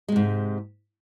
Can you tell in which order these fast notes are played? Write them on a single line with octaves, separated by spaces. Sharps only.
G#3 C3 G#2